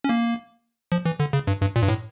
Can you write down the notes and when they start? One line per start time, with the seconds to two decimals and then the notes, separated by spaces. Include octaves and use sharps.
0.04 C#4
0.09 A#3
0.92 F3
1.05 E3
1.20 D3
1.33 C#3
1.47 G2
1.61 G2
1.76 A#2
1.82 G2
1.88 A2